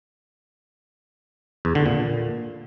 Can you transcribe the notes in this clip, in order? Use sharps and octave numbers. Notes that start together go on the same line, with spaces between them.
E2
D3
A#2